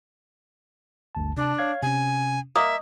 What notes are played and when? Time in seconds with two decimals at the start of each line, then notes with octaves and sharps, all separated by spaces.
1.15 G1 D2 A5
1.37 C3 D4 A5
1.58 C#5 F5 G#6
1.82 C3 C#4 G#5
2.56 A#3 D#5 E5 D#6